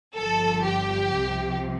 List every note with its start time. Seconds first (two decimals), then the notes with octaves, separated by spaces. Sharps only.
0.16 G1 G2 F3 A4
0.65 G4
1.16 C2 C3 F3